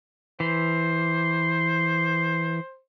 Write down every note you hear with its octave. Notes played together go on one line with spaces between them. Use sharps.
E3 C5